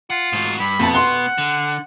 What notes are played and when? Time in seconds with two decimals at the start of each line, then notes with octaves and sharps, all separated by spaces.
0.10 F4 F#5
0.33 G#2 F#4
0.59 G2 B5
0.79 F2 B2 B3 A5
0.95 F#5 C6
1.38 D3